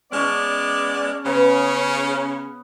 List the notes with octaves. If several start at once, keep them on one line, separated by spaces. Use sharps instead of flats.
G#3 B3 C#4 D5 A5
C#3 B3 C#4